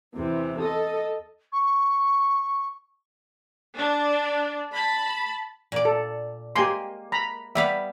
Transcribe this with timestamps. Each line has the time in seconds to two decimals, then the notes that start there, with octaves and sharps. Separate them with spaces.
0.16 E2 C3 E3
0.62 A4 D#5
1.52 C#6
3.77 D4
4.74 A5 B5
5.72 A#2 D5
5.85 A4
6.56 G#3 A#3 G4 G#5 C6
7.12 A#5 B5
7.55 G3 B3 E5 F5 B5